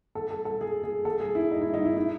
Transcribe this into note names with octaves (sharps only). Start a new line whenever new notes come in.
A4
A4
A4
G#4
G#4
A4
G#4
E4
D#4
E4
D#4
E4
E4